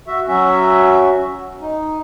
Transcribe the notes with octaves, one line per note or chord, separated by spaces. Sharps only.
F#4 E5
F#3 C#4 F#4 E5
D#4